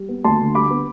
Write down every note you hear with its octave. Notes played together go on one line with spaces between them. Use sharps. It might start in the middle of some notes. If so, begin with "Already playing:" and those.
Already playing: G3
B3
D2 A5 C6
D3
G3 B5 D6
B3